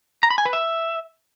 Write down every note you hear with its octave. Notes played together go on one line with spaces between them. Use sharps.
A#5
B5
G#5
B4
E5